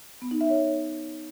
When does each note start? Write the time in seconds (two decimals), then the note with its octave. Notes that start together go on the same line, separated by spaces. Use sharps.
0.22 B3
0.31 D#4
0.41 E5
0.50 C#5